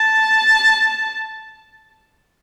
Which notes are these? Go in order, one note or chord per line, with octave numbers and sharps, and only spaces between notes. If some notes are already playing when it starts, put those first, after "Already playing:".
Already playing: A5